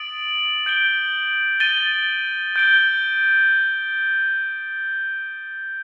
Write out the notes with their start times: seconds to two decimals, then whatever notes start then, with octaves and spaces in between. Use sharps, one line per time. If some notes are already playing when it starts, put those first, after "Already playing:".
Already playing: D#6 A6 D7 F#7
0.66 G6 D7 G7
1.60 A6 D#7 G7
2.56 G6 D7 G7